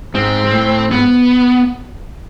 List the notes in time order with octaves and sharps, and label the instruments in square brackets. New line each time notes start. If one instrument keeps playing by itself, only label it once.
[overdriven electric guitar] G#2 [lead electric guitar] C4
[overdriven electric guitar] G#2
A2
[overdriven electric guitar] G#2 [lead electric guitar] B3